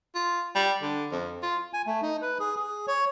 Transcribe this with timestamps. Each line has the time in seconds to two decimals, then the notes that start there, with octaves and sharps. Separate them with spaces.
0.15 F4
0.55 G3
0.82 D3
1.12 F2
1.43 F4
1.73 G#5
1.87 A3
2.02 D#4
2.22 B4
2.40 G#4
2.57 G#4
2.87 C#5